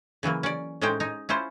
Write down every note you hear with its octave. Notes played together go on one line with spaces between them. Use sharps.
C#3 E3 F#3 A#3
C#4 D5
A2 G#3 C#4 D#4 C5 G5
D#4 G#5 A#5
C#4 E4 F4 C5